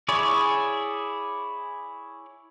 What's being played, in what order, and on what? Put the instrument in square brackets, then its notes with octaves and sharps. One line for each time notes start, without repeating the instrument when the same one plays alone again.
[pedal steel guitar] E4 G#4 C#5 D5